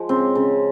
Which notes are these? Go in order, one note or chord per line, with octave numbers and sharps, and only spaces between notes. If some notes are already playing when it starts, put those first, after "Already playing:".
Already playing: F3 G#3
C#3 C4
C#3